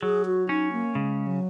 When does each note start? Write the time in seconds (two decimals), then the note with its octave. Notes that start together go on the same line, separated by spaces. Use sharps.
0.02 F#3 G#4
0.25 F#4
0.49 C#4 D#4
0.72 A#3
0.95 C#3 G#3
1.27 F#3